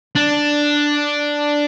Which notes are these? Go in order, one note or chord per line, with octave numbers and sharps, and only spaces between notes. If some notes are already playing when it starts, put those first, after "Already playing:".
D4